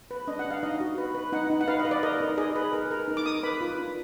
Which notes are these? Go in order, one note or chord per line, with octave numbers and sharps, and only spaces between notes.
B4
D4 D#5
F#5
D4
F5
D#4 D#5
F#4
B4
B4
D#4 F#5
D#4
F#5
B4 F5
D#5
B4
D5
A#4 D#5
D#4
G#4 D#5
B4
A#4
A#4
D#4
D6
A#4 D#6
D6
B4 B5
F4
D4